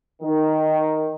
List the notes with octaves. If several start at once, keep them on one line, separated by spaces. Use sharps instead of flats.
D#3